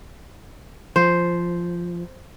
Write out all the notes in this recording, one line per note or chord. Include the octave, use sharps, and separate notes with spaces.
F3 C5